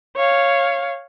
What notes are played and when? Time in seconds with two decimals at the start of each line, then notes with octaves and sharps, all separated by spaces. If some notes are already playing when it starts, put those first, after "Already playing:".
0.16 C#5 F5